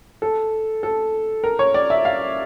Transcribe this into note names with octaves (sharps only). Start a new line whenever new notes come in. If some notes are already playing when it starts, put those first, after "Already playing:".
A4
A4
A#4
C#5
D5
E5
F5